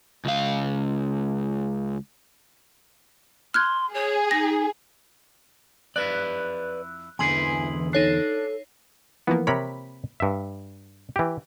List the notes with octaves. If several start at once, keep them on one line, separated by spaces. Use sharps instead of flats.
C#2 F5
C6 F6 F#6 G#6
G#4 C#5
D#4 A#6
F2 E4 B4 D5 F#6
E2 D3 E3 E4 G#4 G#5 C6 F#7
D4 D#4 A4 C#5 C7
E3 F3 A#3 B3
C3 A#4 C#5 B5 B6
G2 E5
E3 G4